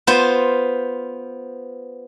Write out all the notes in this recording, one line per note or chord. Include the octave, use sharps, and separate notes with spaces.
B3 F4 C5